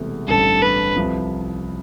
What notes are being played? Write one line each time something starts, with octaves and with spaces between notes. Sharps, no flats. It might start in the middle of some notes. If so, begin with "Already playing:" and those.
Already playing: E1 E2 C3 E3 A3
A1 G2 D3 G3 C4 A4
B4
C2 C3 F3